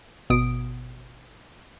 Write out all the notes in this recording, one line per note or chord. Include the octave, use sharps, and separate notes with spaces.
G#1 B2 B3 D#6 D7